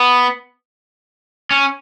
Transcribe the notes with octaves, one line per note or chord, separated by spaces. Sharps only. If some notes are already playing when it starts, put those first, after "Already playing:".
Already playing: B3
C#4